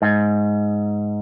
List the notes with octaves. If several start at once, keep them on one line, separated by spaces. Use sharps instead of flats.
G#2